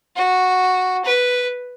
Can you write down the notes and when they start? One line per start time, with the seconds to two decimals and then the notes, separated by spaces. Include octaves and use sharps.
0.16 F#4
1.05 B4